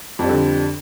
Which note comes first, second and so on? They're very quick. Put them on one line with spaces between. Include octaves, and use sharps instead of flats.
F2 G3 D3